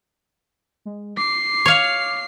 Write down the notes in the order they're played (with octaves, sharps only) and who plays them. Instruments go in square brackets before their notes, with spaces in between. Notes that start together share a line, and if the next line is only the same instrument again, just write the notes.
[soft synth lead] G#3
[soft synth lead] D6 [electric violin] C7
[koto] C#5 F5